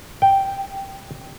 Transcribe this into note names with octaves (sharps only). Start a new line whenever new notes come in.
G5